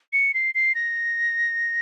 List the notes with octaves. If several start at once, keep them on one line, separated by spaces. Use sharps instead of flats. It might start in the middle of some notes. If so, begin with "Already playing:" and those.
C#7
C7
C7
A#6